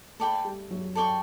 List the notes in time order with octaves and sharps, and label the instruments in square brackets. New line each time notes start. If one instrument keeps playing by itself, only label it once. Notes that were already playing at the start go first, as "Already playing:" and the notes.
[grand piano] A3 [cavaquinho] A4 D5 G5 B5
[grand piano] G3
F#3
[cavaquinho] A4 D5 G5 C#6